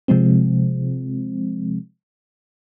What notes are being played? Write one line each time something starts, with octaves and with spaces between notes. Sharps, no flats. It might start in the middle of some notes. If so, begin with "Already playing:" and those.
C3 F3 G#3 C4